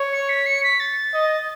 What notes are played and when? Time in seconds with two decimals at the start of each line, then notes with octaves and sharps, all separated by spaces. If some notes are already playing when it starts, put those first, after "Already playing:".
Already playing: C#5
0.13 C#7
0.29 B6
0.46 C#7
0.63 B6
0.80 A6
1.14 D#5